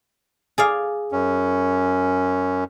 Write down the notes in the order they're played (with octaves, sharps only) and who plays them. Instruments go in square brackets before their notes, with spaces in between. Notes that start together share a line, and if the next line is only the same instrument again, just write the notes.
[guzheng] G#4 D5 F5
[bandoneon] F#2 C#4